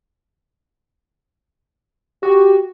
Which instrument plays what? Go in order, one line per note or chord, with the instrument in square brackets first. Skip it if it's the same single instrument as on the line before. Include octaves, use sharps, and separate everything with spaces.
[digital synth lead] F#4 [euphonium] G4